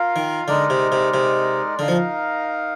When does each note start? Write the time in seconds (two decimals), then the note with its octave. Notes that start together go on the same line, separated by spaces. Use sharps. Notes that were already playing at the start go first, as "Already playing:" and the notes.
Already playing: F4 A#4 F5
0.16 D#3
0.48 D3 G#3 D#4 A#4 D5
0.70 C3
0.92 C3
1.14 C3
1.78 D3 D#4 A#4 F5
1.88 F3